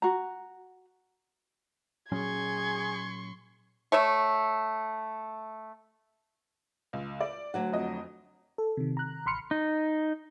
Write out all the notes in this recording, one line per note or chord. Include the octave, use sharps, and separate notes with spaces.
F#4 A#5
A#2 F#3 C#4 G#4 C6 C#6 G#6
A3 C#5 E5
C#2
D5
D2 F#3 F#5
F2 D#5
A4
C3 D#3
A#5 F#6
A1 B5 C6 F6 C#7
D#4